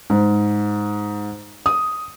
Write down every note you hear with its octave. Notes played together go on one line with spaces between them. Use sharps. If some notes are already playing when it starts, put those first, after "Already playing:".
G#2
D#6